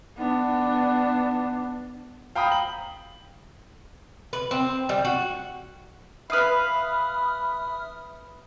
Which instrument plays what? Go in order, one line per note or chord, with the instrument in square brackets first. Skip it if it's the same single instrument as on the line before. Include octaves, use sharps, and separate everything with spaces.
[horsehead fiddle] B3 D4
[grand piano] F5 G5 A#5 B5 D#6
F#7
[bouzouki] B4
C4
G3
F#4
[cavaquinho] B4 F5 [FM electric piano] E5 D#6 F6 [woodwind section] B5